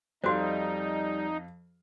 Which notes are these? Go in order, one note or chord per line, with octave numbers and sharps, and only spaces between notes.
F2 G3 D#4 F#4 C5 F5